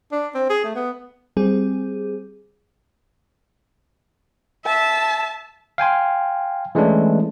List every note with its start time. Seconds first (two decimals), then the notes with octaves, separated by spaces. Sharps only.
0.12 D4
0.35 C4
0.50 G#4
0.64 A3
0.76 B3
1.37 G3 C4 G#4
4.65 E5 A5
5.78 F5 G5 G#5 C6
6.75 E3 G#3 A3 C#4 D4